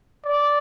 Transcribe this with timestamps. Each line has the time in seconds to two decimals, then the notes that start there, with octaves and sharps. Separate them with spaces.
0.24 D5